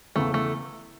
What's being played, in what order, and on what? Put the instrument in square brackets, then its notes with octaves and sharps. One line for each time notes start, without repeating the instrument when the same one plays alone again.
[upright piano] E2 C#3 E3 B3 [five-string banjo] A3
[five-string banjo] A3